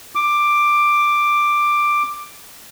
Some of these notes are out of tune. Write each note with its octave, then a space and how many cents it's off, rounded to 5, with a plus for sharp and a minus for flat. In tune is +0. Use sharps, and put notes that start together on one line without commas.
D6 +10